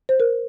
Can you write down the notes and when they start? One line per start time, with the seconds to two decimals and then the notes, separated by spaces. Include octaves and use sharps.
0.09 C5
0.20 A#4